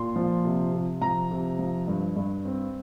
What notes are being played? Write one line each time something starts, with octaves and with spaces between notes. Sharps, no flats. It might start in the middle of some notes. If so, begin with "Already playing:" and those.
Already playing: A#2 C6
F3
C3
C3
F3 A#5
C3
F3
G2
G2
C4